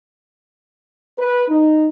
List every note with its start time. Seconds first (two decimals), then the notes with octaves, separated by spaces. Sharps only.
1.19 B4
1.49 D#4